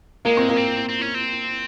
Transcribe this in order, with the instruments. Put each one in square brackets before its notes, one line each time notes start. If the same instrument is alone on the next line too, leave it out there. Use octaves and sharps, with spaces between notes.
[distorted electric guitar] G#3 [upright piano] A#3
[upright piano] C4
A#3
[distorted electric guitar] C4
C4
C#4
C4